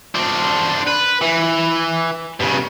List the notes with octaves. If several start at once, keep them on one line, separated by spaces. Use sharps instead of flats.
D4 C5
B4
E3
G2 C#3